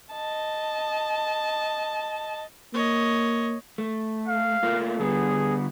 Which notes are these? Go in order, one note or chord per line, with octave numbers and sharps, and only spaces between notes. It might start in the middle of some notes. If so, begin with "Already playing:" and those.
D#5 A5
A#3 C#5 D#5
A3
F5
A3 A#3 F4
D3 G3 B3 G#4